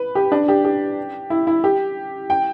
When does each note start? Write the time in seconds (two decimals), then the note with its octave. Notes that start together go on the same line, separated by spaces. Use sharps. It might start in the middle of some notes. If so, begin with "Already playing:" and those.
Already playing: B4
0.15 G4
0.32 D4
0.48 G4
0.65 G4
1.30 E4
1.47 E4
1.64 G4
2.30 G5